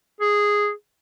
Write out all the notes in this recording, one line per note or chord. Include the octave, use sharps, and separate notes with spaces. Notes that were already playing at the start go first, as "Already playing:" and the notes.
G#4